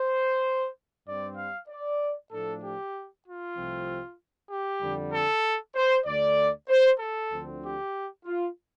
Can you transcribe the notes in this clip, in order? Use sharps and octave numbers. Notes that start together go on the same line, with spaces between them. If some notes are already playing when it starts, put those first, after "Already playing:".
Already playing: C5
G2 G3 C4 D5
F5
D5
A2 F3 A3 D4 A4
G4
F4
C2 C3 F3 A3 C4
G4
F2 D3 G3
A4
C5
D2 D3 A3 D5
C5
A4
D2 D3 F3 C4
G4
F4